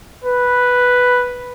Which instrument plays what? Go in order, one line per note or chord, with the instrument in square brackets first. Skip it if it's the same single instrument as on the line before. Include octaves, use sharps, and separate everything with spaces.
[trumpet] B4